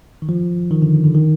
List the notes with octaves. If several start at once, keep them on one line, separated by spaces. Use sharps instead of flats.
D#3
F3
D#3
D3
D3
D#3